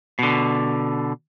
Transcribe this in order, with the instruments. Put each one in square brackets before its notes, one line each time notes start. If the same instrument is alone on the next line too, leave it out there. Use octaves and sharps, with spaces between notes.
[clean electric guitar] B2 D3